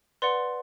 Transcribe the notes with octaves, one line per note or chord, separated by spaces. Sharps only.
B4 D5 F#5 C6